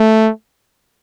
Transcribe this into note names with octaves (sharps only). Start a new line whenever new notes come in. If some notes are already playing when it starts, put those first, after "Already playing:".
Already playing: A3